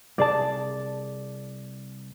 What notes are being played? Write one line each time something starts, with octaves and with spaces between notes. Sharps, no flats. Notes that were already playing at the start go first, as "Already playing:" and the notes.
C2 G#4 D5 A5